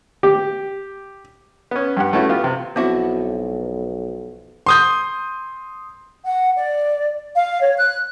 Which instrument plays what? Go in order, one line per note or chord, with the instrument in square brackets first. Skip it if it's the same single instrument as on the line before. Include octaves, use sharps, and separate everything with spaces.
[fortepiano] G4
B3 C#4
G2 G4 F#5
A3 B3 C#4 E4 F#4
B3 F4 G4
C3
[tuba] B1 [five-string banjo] F3 E4 F#4 [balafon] B3 C4 D6
[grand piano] C6 D#6 G6
[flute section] F#5
D5
F5
C#5
F#6